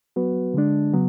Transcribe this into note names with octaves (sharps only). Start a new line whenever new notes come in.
F#3 B3 F#4 B4
D3 G#3 D4
C#3 F#3 B3